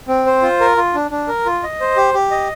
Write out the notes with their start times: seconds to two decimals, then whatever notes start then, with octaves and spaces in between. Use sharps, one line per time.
0.08 C4
0.26 C5
0.42 F4
0.60 A#4
0.77 F4
0.95 D4
1.11 D4
1.28 A#4
1.46 F4
1.63 D#5
1.80 C5
1.96 G4
2.14 G4
2.31 D#5